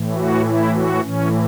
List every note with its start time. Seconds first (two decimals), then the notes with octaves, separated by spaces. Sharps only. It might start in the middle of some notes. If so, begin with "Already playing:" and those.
Already playing: A2 E3
0.15 F#4
0.45 E4
0.74 F#4
1.02 A2 E3 C#4